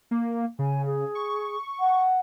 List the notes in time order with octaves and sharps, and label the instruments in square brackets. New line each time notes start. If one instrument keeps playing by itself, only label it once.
[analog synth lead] A#3
[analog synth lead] C#3 [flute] G#5
[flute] G#4
[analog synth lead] C#6
[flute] F#5